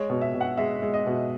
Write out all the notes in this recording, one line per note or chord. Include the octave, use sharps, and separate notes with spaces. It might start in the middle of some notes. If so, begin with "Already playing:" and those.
Already playing: G#3 C#5
B2
E5
B2
F#5
G#3 E5
G#3
D#5
B2